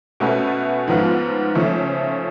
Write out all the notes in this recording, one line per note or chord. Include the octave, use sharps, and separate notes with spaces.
B2 A3 C#4 F#4 B4
G#2 F3 B3 F4
C#3 F3 A3